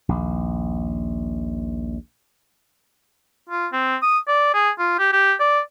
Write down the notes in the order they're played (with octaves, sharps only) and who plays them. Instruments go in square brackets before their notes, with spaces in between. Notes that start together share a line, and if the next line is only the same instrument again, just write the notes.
[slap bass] A#1 D#2
[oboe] F4
C4
D#6
D5
G#4
F4
G4
G4
D5